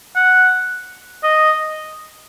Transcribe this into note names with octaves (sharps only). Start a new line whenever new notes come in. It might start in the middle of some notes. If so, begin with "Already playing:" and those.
F#5
D#5